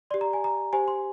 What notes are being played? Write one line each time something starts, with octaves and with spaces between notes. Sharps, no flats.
G4 D5 C6
A#5
G#5
A#5
G4 C5 G#5
C6